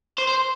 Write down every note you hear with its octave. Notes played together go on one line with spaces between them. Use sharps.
C5
C5